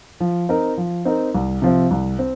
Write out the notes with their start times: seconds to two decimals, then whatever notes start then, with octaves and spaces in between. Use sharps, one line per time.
0.20 F3
0.49 C4 D#4 A#4
0.77 F3
1.05 C4 D#4 A#4
1.35 C2
1.62 C3 F3 C4
1.91 C2
2.19 C4